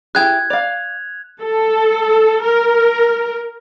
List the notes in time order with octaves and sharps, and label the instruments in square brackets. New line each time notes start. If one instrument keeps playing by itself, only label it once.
[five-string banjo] E4 G4 G#4 [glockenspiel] F#6 G#6
[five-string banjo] D5 F5 [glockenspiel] F7
[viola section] A4
A#4